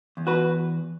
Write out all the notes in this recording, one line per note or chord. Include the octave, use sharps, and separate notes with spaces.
E2
F#4 B4